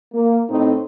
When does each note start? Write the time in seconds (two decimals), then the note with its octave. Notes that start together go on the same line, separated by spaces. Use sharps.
0.14 A#3
0.50 A2 C4 D#4